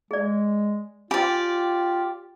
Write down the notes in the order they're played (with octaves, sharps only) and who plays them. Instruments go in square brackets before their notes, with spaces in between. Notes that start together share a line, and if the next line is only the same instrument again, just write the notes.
[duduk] G#3 [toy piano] G#4 D5
[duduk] F4 [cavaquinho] G4 D5 [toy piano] G5 G#5 B5